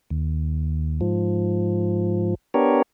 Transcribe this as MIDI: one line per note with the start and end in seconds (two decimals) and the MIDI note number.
0.10 1.01 39
1.01 2.35 44
1.01 2.35 53
2.54 2.82 59
2.54 2.82 62
2.54 2.82 67
2.54 2.82 70
2.54 2.82 73